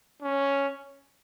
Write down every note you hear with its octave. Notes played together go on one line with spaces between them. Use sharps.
C#4